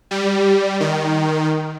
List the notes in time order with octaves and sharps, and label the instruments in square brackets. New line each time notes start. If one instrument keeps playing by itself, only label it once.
[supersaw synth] G3
D#3